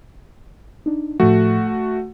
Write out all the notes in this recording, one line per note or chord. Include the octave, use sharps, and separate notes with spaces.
D4 D#4
A2 F3 A3 F#4
F#5